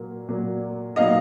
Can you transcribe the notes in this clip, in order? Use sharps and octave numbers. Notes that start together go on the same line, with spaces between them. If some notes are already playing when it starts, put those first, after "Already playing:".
Already playing: A#2 F#3 A#3
A#2 F#3 A#3
A#2 F#3 B3 D#4 D#5 F5